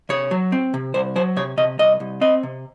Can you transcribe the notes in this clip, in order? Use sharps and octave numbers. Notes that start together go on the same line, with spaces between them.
C3 C#5
F#3
C4
C3
C2 C5
F#3 C5
C3 C#5
C3 D#5
C2 D#5
C2
C4 D#5
C3